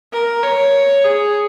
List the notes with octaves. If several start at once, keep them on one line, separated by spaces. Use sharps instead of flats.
A#4
C#5
G#4